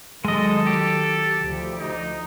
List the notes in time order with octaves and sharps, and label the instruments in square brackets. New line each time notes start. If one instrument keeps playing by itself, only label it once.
[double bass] D#3 F#3 [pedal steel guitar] G#3 D#5 [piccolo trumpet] A4
[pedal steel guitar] G4
[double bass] D2 F3
[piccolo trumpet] D#4